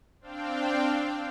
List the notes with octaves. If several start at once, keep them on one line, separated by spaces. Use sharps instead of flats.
C4 D4 F5 G5